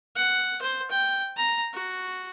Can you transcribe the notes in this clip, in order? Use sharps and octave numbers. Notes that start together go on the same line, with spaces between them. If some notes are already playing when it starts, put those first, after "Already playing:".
F#5
C5
G5
A#5
F#4